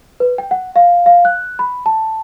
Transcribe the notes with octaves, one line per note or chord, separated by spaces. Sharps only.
B4
G5
F#5
F5
F5
F#6
B5
A5